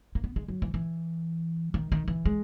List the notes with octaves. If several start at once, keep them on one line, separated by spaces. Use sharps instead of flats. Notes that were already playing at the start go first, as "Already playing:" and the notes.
A#3
B3
G#3
F#3
E3
E3
D#3
D#3
E3
G#3